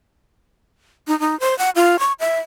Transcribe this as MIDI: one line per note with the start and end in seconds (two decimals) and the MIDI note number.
1.08 1.18 63
1.20 1.38 63
1.40 1.57 72
1.59 1.70 78
1.76 1.99 65
1.99 2.12 85
2.20 2.40 76